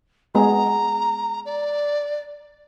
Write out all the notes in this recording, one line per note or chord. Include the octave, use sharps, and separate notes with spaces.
G#3 B3 G#4 A#5
D5